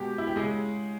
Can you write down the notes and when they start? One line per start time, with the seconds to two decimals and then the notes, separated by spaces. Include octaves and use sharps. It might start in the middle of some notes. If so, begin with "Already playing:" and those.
Already playing: B2 G#3 G4
0.18 E4
0.27 G4
0.36 C#3 G#3 G#4